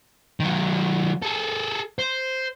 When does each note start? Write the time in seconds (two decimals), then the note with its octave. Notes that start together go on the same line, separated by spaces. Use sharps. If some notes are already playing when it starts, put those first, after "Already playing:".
0.40 D#3 F#3
1.23 G#4 A4
1.99 C5